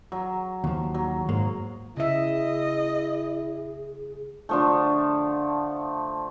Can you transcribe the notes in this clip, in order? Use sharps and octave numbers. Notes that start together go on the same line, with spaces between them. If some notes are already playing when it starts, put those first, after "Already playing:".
F#3
D#2 F3
F#3
G#2 G#3 A#3
C#3 E4 G#4 D#5 E5
D3 F3 A3